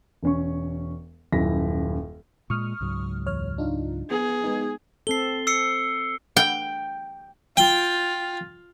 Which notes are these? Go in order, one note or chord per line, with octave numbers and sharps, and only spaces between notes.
E1 C#4 C#6
D#1 F#2 E4 A#6 B6
A#2 G#3 C#6 D#6 F6
C#2 G#2 F#3
E2 C#5 F6
D4 D#4 F4
B3 G#4
G#3 B3 D#4
C4 A4 C7 G7
E6 C7 C#7
G5
F4 G5